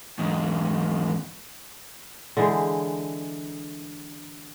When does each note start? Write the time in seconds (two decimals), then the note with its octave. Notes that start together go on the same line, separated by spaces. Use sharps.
0.19 E2 G#2
2.37 D3 E3 G#3 C5